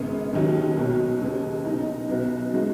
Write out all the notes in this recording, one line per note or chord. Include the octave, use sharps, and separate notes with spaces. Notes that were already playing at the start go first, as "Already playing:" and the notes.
Already playing: G#1 F#2 C#3 G#3 B3
D#2 D#3 F#3
B1 B2 F#3
D#2 C#3 B3
B1 B2 F#3 D#4
B1 B2 B3 F#4
C#3 G#3 D#4 F#4